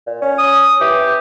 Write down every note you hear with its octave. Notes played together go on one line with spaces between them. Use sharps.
A#2
C#4
D#6
E3 G4